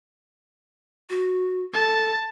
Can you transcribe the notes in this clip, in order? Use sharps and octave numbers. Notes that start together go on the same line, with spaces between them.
F#4
A4 A5